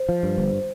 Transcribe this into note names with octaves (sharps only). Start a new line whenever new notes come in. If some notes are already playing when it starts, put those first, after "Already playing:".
Already playing: C5
F3
G2
G1